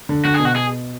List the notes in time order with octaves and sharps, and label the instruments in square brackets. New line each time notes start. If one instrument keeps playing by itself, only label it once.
[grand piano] D3
[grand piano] D3 [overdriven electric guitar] F#4
[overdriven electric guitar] G#4
[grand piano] B2
[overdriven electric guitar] F#4
G#4